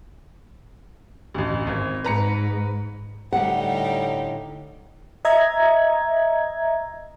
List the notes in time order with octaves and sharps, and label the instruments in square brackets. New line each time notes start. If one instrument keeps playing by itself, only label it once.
[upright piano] A1 D2
G#1
[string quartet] G#2 [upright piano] B4 A#5 C#7
[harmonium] A2 D3 [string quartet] G3 D#4 G4 [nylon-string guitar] F#5
[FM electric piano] D#5 E5 A#5 G#6